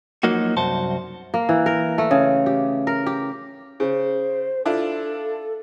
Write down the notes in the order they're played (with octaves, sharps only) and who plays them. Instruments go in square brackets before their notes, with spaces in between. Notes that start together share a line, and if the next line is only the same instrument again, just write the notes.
[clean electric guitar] F3 F#3 A#3 D#4 F#4
C2 F#2 F#4 C5 A5
[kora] A#3
E3
A#4
A3
C#3
G4
A#4
G4
[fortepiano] C#3 [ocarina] C5
[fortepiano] D4 E4 F4 [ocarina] A4